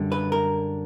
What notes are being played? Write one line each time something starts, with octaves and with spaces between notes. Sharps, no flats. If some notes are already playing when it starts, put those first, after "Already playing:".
Already playing: F#2 D3 G3
B4
A#4